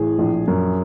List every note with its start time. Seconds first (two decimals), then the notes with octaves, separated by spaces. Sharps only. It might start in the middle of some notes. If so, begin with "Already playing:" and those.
Already playing: A1 A2 G#4
0.19 A#1
0.48 F#2